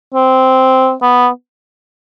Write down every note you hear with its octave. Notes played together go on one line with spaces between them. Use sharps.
C4
B3